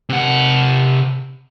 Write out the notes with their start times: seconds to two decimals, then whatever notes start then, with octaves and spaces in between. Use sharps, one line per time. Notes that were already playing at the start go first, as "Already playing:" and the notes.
0.09 C3 F#5